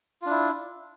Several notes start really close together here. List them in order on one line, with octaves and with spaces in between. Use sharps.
F4 D4 E4